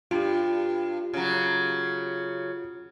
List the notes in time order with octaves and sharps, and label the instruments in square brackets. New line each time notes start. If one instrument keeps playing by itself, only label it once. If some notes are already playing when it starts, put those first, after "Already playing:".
[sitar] G2 [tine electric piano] F4 G4
[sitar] C#3 F#3